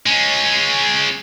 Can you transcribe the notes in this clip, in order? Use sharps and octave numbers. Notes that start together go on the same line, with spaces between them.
G#3 C#4